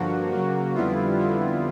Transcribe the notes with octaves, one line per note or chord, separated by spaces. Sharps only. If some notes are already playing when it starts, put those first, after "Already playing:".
Already playing: G2 D3 F3 A#3 F#4
C#3 F#3 A#3
F2 D3 G3 B3 E4 F4
F2 D3 G3 B3 E4